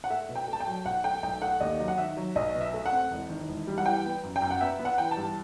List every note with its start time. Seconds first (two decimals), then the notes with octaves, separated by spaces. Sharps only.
0.04 F#5
0.10 A3 E5
0.29 B2
0.36 G5
0.48 A3 A5
0.60 G5
0.67 F#3
0.85 B1 F#5
1.04 A3 G5
1.23 B1 G5
1.42 A3 F#5
1.60 D#2 D#5
1.79 F#3
1.88 F#5
1.98 D#3 E5
2.17 F#3
2.36 B1 D#5
2.55 B2
2.61 E5
2.74 A3
2.86 F#5
2.92 C4
3.11 E1
3.30 D#3
3.49 E1
3.67 G3
3.78 F#5
3.86 E3 G5
4.05 B3
4.23 F#2
4.36 G5
4.42 F#2
4.51 F#5
4.61 B3 E5
4.79 B3
4.85 F#5
4.98 E3 G5
5.11 A5
5.17 G2